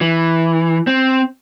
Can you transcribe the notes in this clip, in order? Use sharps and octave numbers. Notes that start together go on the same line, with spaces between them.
E3
C4